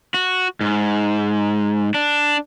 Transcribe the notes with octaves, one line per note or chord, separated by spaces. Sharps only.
F#4
G#2
D4